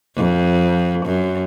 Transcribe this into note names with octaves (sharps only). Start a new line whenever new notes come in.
F2
F#2